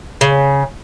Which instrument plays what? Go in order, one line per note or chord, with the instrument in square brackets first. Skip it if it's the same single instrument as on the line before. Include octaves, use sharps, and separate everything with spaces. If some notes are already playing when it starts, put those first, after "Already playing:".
[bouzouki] C#3